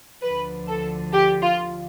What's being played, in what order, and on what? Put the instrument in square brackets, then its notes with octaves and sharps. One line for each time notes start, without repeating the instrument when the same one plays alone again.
[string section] D2 D3 F3 B4
A4
G4
F4